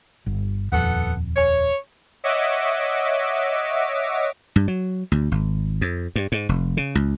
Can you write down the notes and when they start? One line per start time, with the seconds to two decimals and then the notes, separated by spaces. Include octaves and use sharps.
0.26 G1
0.72 D#1 F2 B3 A4 F#5
1.36 C#5
2.24 C#5 D#5 E5 F#5 D6
4.56 G2
4.68 F#3
5.12 D2
5.32 G#1
5.81 F2
6.16 G2
6.32 G#2
6.49 F1
6.77 C#3
6.95 C#2